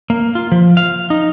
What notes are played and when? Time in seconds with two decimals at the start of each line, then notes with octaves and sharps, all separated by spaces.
0.10 A#3
0.35 F4
0.52 F3
0.77 F5
1.10 D#4